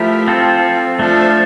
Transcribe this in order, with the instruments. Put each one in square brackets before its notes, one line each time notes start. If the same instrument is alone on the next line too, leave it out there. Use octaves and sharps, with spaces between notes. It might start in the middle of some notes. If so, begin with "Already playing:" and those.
Already playing: [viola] F3 [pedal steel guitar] A3 E4 G4 A#4
[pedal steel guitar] C4 F4 A4
[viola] F3 [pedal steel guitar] A3 D4 A4